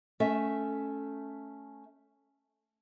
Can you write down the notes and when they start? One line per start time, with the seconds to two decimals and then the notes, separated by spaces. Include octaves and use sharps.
0.20 A3 C#4 A4 E5